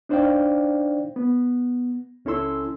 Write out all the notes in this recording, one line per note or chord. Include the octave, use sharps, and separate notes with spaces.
D4 D#4 C5 D5 F5 G5
B3
C#2 C#4 E4 A4 C6 E6